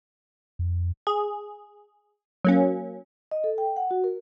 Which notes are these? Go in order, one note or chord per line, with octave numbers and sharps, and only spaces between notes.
F2
G#4
F#3 A#3 C#4
D#5
A4
G5
F#5
F#4
A#4